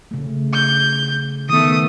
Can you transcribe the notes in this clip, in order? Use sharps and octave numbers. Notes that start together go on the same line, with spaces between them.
C#3 A3
G6
D#3 A3 B3 D#6